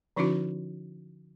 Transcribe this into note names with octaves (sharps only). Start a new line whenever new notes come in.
D3 F3 C#4 D#4 E4 F#4